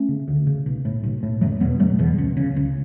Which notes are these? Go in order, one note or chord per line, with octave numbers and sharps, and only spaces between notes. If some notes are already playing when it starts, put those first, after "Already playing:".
Already playing: A3 C#4
C#3
D2
C#3
B1
A2
B1
A2
F#1 F#3 A3
E2 B2 G3 B3
F#1 F#3 A3
E2 B2
C#2
C#3
C#2